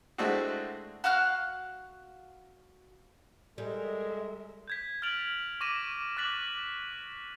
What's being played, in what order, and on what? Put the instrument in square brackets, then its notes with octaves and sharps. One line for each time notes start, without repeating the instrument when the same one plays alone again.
[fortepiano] G#3 A3 C4 D4 E4 F#4
[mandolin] F#4 F5 F6 F#6
[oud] G3 [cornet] G#3 [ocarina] A4 [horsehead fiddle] A#4 E5
[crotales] G6 G#6 B6
F6 G#6 A6 D7 F7 F#7
C#6 D6 A#6 D#7 E7
D6 F#6 A6 B6 F#7